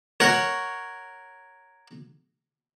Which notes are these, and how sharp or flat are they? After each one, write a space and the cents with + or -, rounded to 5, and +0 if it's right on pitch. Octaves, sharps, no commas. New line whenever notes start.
A#4 -5 C#5 +0 F#5 +0